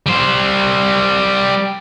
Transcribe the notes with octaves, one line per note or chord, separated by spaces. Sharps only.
G3 C5